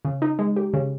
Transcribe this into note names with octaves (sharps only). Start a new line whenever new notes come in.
C#3
D#4
G#3
G4
C#3